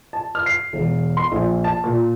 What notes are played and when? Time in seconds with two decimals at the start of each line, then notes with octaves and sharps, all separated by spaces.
0.13 A5
0.35 F6
0.46 C7
0.73 E1
1.17 C6
1.32 A#1
1.64 A5
1.84 A#2